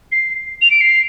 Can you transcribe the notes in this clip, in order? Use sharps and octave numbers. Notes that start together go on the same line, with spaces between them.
C7
F7
D7
C7